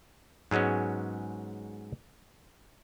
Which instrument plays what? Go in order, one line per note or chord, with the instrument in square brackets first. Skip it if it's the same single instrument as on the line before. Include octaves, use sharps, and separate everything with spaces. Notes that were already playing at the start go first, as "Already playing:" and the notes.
[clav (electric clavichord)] G#2 F#3 G#3 B3 C#4